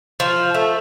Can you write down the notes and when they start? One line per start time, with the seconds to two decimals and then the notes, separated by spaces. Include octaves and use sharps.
0.20 F3
0.54 A3